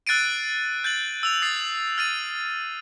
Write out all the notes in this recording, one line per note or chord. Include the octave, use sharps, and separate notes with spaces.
E6 F#6 A6 C7 D7 D#7
G6 A6 F#7
E6 F7 F#7
D#6 A6 C7
F6 A6 D#7